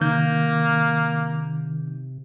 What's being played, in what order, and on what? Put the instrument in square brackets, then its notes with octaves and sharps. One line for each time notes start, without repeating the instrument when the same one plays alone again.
[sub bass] C3 [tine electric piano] D#3 G6 [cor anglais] A#3